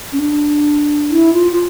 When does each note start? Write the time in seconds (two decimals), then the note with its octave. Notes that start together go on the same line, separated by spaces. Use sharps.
0.13 C#4
0.19 D4
1.10 E4
1.33 F4
1.52 F4